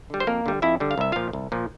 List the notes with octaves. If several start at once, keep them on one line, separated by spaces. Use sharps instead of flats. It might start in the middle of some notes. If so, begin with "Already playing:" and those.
D3 G3
C5
F2 A#3 A#4
D3 G3
F2 E4 E5
D3 G3
F5
C2 E5
A#2 F3 F4 F5
C2
A#2 F3